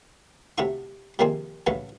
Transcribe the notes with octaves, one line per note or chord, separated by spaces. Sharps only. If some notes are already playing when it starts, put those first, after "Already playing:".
C3 A3 E4 F#4 F5 C#6
C3 D#3 F3 A#3 C4 G#4
A1 C#3 F#3 A3 B4